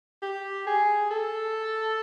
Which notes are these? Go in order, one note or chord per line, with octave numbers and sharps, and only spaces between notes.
G4
G#4
A4